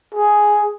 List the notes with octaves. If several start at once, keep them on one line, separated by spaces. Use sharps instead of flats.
G#4